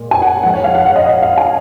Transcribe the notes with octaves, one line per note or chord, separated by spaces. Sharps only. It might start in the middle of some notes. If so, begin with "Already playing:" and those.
Already playing: A#2 G#3
G#5
F#5
G#2 F3 G#3 F#5
C#5
F5
F#5
F#5
D#5
D#5
F5
G#5